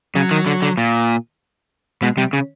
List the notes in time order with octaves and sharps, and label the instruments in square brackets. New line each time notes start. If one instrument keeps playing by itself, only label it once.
[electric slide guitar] C#3 [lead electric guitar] F#3
[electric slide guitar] D#3
D3
D3
A#2
[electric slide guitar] B2 [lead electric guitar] G#3
[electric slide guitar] C3 [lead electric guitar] G3
[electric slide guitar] C#3